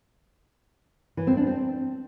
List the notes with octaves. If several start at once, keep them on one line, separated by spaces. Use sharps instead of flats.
E3
C4
D4
C4